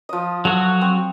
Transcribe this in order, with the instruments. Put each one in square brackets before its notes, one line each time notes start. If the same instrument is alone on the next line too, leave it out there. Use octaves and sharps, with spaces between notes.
[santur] F3 D#5
[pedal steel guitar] F#3 F#4 [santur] A4
[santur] C4